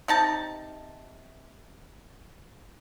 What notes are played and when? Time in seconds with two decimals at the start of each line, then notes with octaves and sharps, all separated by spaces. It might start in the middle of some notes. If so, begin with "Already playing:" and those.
0.08 C3 D#4 A5